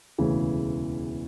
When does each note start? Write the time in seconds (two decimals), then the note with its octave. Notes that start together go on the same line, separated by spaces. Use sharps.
0.18 E1 D2 C#3 E3